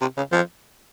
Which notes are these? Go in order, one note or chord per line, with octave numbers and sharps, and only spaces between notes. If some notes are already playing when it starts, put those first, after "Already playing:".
C3
C#3
F3